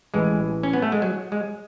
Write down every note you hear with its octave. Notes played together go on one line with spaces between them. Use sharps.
A1 A2 E3 G#3
C#4
B3
A3
G#3
F#3
G#3